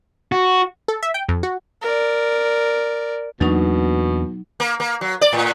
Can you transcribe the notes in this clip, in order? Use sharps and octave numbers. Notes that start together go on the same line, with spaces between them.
F#4
A4
E5
G5
F2
F#4
A#4 D5
E2 B2 F#3 A#3 D4 D#4 C#6
A#3
A#3
F#3
D5
A2